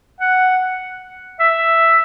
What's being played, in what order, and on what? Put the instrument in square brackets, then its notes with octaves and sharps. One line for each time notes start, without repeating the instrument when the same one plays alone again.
[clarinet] F#5
E5